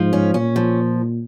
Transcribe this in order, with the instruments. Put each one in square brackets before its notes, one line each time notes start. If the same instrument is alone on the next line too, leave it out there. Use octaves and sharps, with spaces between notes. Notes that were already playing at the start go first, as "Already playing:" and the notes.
Already playing: [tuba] G#2 [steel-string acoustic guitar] F3
[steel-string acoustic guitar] C#4
[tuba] A#2 [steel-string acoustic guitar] C#4
[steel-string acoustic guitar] F3